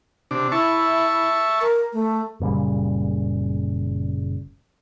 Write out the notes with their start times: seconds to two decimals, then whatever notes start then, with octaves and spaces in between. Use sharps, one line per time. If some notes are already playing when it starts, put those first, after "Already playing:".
0.31 C3 D4
0.52 E4 E5 A5 C#6
1.61 A#4
1.93 A3
2.40 F#1 A#2 C#3 G3